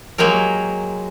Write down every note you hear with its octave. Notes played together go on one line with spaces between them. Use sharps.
F#3 G#3 A#3 G4 A#4